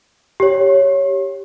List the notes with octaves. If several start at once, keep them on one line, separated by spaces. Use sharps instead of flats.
G4 C#5